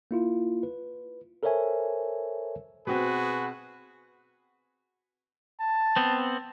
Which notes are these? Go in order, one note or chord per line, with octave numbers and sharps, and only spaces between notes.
A#3 E4 F4
B4
A4 A#4 C5 C#5 E5 G#5
B2 C4 F#4 G#4 B4
A5
B3 C4